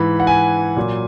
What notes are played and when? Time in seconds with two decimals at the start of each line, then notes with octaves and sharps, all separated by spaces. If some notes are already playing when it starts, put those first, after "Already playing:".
Already playing: G#2 E3 B5
0.20 F#5
0.27 G#5
0.76 A#2 F#3